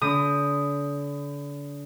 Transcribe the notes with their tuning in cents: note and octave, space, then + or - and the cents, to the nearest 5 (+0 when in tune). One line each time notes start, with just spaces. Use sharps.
D3 -40 D#6 +0